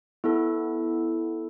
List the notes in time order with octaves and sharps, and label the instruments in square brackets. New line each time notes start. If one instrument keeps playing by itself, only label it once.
[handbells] B3 E4 A4